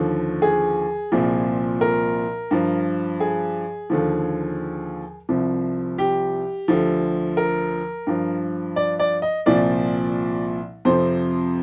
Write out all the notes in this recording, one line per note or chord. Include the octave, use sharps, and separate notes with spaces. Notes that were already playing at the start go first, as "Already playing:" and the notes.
Already playing: D#2 D3 F3
G#4
C2 A#2 F3
A#4
G2 F3
G#4
D#2 D3 F3
C2 C3 F3
G4
D2 D3 F3
A#4
G2 F3
D5
D5
D#5
C2 A#2 F3 D5
F2 C3 F3 C5